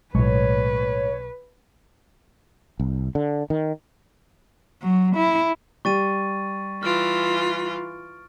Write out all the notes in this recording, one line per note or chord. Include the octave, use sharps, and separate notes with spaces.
B1 A2 G#3 B4 C#5
C2
D3
D#3
F#3
E4
G3 C#6 A6 D#7
E3 F4 F6 D7